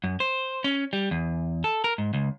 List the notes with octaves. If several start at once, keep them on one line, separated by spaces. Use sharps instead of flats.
F#2
C5
C#4
G3
E2
A4
A#4
G#2
C#2